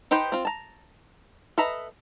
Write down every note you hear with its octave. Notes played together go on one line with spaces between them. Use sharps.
D#4 G4 B4 C5 G5
C4 F4
A5 A#5
A4 B4 D#5 E5 A#5